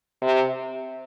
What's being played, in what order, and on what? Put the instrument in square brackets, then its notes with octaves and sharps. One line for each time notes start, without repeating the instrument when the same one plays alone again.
[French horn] C3